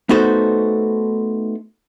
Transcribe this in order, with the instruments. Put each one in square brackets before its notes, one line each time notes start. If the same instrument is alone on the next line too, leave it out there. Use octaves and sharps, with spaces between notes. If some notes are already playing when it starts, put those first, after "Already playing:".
[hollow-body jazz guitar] A3 B3 D#4 F#4 A4 C5